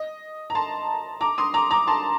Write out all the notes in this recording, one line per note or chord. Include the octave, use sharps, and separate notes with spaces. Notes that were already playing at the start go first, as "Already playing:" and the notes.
Already playing: D#5
A#5
A5 C6
A#5 D6
C6 D#6
A#5 D6
A#5 D6
A5 C6